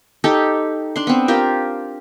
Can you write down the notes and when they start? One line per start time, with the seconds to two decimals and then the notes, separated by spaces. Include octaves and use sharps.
0.24 D#4 G4 A4
0.96 D4 C6
1.07 B3 C4
1.28 F4 G4 A#4